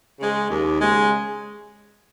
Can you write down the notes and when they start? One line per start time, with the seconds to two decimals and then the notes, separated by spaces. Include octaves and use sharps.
0.18 C#3 G#3
0.49 D#2
0.80 C#3 G#3